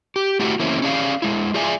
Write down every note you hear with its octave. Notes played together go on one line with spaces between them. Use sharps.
G4
A3 E4 F#4 G4
E3 A#3 C4 C#4 E4
C#4 G#4 D5 F5
G#3 E4
F4 G#4 D5 E5 G#5